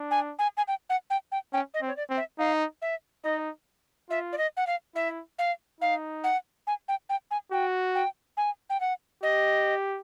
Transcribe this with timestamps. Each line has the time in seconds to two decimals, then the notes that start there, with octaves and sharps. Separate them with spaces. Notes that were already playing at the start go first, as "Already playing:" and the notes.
Already playing: D4
0.11 G#5
0.39 G#5
0.57 G#5
0.68 G5
0.90 F#5
1.10 G5
1.32 G5
1.53 C#4 G5
1.74 D#5
1.82 C4
1.88 C#5
1.97 D5
2.10 C4
2.17 E5
2.39 D#4 F5
2.82 E5
3.24 D#4 D#5
4.10 F4 E5
4.33 D5
4.38 D#5
4.57 F#5
4.67 F5
4.95 E4 E5
5.39 F5
5.81 D#4 F5
6.24 F#5
6.67 G#5
6.88 G5
7.09 G5
7.31 G#5
7.52 F#4 G5
7.95 G5
8.37 G#5
8.70 G5
8.80 F#5
9.23 G4 D#5